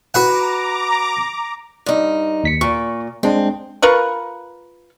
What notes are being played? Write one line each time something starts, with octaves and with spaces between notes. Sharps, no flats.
F#4 B4 F#5 A#5 D6
G2 D#4
D#2 B6 C#7
A#2 C#6
G#3 C4 D4
F4 A#4 B4 C#6